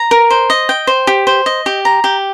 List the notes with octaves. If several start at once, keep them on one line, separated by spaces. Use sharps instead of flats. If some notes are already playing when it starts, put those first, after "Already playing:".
Already playing: A#5
A#4
C5
D#5
G5
C5
G4
C5
D#5
G4
A#5
G4